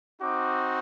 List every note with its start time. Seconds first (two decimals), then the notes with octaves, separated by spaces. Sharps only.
0.22 C4 D#4 F#4 D6